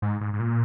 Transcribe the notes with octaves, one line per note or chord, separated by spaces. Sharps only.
G#2
G#2
G#2
A#2